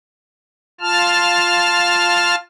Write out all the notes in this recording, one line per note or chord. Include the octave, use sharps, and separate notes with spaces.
F4 A5 F6